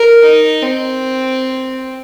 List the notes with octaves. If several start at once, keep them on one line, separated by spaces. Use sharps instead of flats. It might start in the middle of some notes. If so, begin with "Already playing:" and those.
Already playing: A#4
D#4
C4